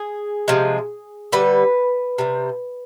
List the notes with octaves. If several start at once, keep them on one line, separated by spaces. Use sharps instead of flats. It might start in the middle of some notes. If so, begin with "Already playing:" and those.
Already playing: G#4
C3 F3 G#3
D3 G3 B4
C3 G3